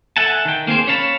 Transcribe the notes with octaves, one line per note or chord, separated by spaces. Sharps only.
A4 E5 F#5 G#5 A5
D#3 G5
A#3 C4 G#4 C5
C#4 C#5 F5 A5 B5